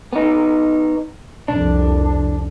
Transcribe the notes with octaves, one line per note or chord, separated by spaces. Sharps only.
B3 D#4
C2 F2 D4